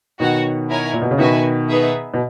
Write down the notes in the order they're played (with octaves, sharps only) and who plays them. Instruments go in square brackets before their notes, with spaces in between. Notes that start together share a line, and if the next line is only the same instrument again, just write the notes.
[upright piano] B2 D#3 [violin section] F#4 C#5 F#5
[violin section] E4 A#4 C#5 G#5
[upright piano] A#2
B2
C#3
[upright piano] B2 D#3 [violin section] F#4 B4 E5 G#5
[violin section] B3 D#4 G#4 B4 E5
[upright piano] B2